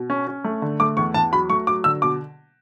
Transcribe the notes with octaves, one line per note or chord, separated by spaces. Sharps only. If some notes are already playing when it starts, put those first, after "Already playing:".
Already playing: B2
C#4
C#4
A3
D3
A3 D6
E2 C#6
E2 A5
F#3 B5
A3 C#6
F#3 D6
D3 E6
B2 D6